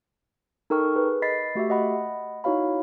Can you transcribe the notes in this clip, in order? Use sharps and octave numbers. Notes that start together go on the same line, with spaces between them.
D#4 A4 A#4 G5 C#6 F6
G#4 B4
D#5 B5 A6 B6 C7
A3 F#4 G4 E5
D#5 F#5 B5
D#4 E4 F#4 C#5 F5 B5